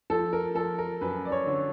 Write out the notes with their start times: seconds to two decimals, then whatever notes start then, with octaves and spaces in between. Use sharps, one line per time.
0.10 F3 A4
0.33 A#4
0.55 F3 A4
0.78 A#4
1.01 F#2 B4
1.25 D5
1.32 C#5
1.46 D3